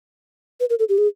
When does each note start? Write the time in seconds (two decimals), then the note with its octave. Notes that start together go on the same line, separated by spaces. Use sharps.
0.60 B4
0.70 A#4
0.79 A4
0.89 G4
0.98 G#4